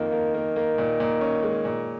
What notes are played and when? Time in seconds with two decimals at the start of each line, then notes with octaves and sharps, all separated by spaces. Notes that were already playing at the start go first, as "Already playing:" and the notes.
Already playing: F2 D#3 F3 A#3
0.12 A#3
0.34 A#3
0.56 A#3
0.78 A#2
1.00 A#2
1.21 C#4
1.43 G#3
1.65 A#2